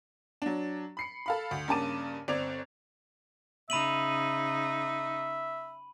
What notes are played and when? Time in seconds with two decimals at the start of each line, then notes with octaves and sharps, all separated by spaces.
0.42 F#3 D4
0.97 B5 C7 C#7
1.26 A4 F5 B5
1.51 D2
1.68 G2 C#3 A#3 A5 D6 D#7
2.28 G1 C4 D5 G#6 F7
3.70 C#3 D#4 E5 B5 D#7 F#7